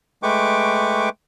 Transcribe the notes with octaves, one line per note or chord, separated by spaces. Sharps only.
G#3 A3 B4 G5 C#6 D6